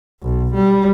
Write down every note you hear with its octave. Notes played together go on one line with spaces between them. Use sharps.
B1
G3